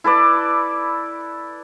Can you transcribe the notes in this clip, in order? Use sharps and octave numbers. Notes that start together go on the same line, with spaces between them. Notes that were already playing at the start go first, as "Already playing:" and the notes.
E4 A4 B4 D5